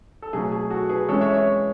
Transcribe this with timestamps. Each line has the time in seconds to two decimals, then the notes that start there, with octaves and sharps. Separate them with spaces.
0.22 A4
0.33 B2 F#3 A3 G#4
0.52 G#4
0.70 F#4 A4
0.89 G#4 B4
1.08 E3 G#3 C#4 A4 C#5
1.21 C#5 E5
1.33 C#5 E5